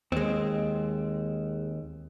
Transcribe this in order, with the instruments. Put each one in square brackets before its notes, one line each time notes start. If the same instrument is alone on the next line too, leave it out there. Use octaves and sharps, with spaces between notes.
[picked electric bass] D#2 [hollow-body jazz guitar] G#3 C4